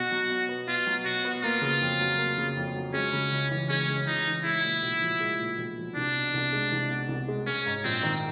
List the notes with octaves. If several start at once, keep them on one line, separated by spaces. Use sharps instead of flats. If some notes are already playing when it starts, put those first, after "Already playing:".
Already playing: B2 F#4
F#3
B2
B3
B2 F4
F#3
B2 F#4
B3
A#3 F4
C#3
F2
F#3
A#3
C#3
F2
F#3
G#3 C#4
C#3
C#2
E3
G#3 C#4
C#3
C#2 D#4
E3
G#3 E4
A#2
B1
F3
G#3
A#2
B1
F3
C2 D4
B2
C2
G#3
C2
B2
C2
G#3
G#3 C#4
G#2
A#1 C4
D#3